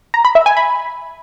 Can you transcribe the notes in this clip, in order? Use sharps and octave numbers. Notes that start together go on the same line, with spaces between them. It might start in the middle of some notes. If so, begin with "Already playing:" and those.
A#5
B5
E5
G#5
B5